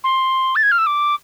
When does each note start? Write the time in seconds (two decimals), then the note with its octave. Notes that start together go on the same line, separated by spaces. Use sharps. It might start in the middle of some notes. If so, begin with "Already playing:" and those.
0.04 C6
0.56 A6
0.63 G#6
0.72 F6
0.78 E6
0.86 D6